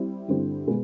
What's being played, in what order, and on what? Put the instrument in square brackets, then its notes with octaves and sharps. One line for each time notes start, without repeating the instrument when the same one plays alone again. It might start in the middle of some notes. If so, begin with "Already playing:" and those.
Already playing: [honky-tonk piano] G3 C4 E4
G2 D3 G3 C4 E4
B2 G#3 B3